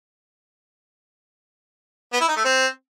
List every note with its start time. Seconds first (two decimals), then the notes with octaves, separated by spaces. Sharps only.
2.13 B3
2.21 E4
2.29 D#4
2.37 A3
2.44 C4